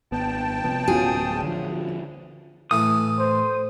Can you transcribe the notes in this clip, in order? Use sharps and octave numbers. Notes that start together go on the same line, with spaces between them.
G#1 B3 G5 A5
C3 F3 B3
D1 B3 C#4 F4 F#4 G#4
D3 F3
A2 E3 A3 D#6
C5